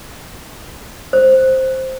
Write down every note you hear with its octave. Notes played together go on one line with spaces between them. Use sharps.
C5